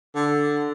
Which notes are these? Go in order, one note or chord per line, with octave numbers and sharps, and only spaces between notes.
D3